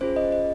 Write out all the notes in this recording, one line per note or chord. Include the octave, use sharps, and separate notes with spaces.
C#4 F4 G#4 C5
D#5
D#5